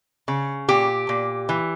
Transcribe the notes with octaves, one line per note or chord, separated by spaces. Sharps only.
C#3
A#2 G4
A#2
E3